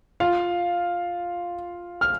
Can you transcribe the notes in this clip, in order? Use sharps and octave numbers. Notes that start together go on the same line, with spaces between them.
F4 F5
F6